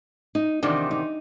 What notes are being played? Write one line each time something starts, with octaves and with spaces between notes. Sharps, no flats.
D#4
E2 C3 D#3 D4
D#4